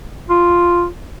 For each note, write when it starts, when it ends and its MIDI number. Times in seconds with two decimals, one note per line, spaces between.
0.30 0.86 65